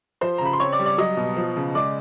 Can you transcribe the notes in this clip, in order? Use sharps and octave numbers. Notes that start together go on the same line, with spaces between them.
F3 C5 C6
A#5
C#3 B5
C6
C4 C#5 C#6
D5 D6
G3
D5 D6
F#3 D#5 D#6
B2
F3
C#3
G#3 D5 D6